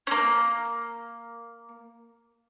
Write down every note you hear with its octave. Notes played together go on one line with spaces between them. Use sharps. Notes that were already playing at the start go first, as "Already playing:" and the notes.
A#3 C#4